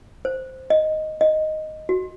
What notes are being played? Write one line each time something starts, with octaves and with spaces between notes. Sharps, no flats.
C5
D#5
D#5
F#4